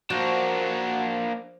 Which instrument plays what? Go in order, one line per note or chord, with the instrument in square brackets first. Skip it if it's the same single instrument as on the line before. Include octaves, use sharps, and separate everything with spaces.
[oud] F3 [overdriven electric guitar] A#3 D4 [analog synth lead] F#4